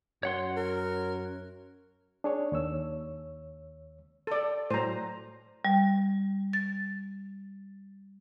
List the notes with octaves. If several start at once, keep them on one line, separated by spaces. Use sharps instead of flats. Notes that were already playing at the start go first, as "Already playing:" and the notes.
F#2 C#5 F#5 C6
A#4
D4 G#4 C#5
D#2 C#5 E6
A4 D5
A2 F#3 C5 A#5
G3
A6